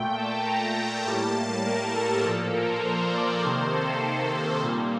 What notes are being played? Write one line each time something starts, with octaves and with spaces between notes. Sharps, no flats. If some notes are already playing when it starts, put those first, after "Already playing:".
Already playing: A#2 A3 G5
A5
A#5
A2 G3 A#3 A5
A#4
A4
A#2 F3 A#3
A#4
C5
D5
C3 D#3 A#3 C5
A4
A4
A#2 G3 A#3